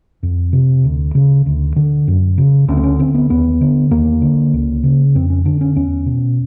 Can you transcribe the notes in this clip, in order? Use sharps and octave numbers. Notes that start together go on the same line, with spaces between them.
F2
C3
D2
C#3
D2
D3
F#2
C#3
D2 C#4
C4
C#4
D3 C4
B3
D#2 B3
D3
D#2 A#3
D3
C#2
C#3
F2 C4
C#4
D3 D4
C#4
E2 C#4
B2